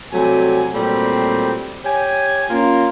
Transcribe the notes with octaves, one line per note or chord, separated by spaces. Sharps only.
C3 F#3 G3 A3 G#5
A#2 F#3 G3 A3 C4
G4 C#5 G#5
A#3 C#4 F4